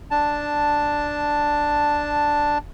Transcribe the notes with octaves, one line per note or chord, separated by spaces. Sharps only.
D4 A5